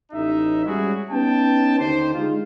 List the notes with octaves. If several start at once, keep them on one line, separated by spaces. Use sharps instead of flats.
A1 D#4 E5
G3 G#3 C#4 E4 F#4 G#4
B3 C#4 D#4 G5 A5
D#2 D3 D#4 G4 C5
G#3 D4 D#4 F4